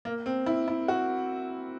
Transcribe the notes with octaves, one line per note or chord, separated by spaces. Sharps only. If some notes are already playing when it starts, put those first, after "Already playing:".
A#3
C4
E4
E4
F#4